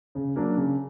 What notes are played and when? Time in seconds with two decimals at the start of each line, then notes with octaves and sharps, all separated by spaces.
0.15 C#3
0.36 F#3 A#3 D4
0.56 C#3